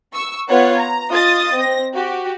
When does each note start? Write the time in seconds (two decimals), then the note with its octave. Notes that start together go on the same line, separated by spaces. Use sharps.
0.13 C#6 E6
0.49 B3 F4 B4 C#5 F#5
0.77 A#5
1.11 F4 D#5 D#6 A6
1.56 C4 A#6
1.94 F#4 G4